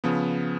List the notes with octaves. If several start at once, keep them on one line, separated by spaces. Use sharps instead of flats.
C#3 F3 B3